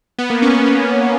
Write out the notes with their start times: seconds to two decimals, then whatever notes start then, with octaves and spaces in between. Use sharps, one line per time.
0.18 B3
0.30 A#3
0.42 C#4
0.54 B3
0.66 B3